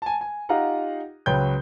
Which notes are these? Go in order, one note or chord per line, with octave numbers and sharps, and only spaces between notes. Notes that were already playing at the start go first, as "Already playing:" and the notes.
G#5 A5
G#5
D#4 F4 G4 F5 F#5 A#5
C#2 F#3 B4 C#5 G5 G6